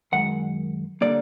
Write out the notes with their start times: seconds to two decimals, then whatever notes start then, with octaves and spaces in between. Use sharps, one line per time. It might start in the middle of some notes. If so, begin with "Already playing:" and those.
0.12 F#2 D#3 G#3 F#5
1.01 D3 G3 A#3 D5